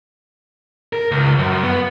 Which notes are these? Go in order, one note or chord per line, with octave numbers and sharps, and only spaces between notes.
A#4
C#2
F#2
B3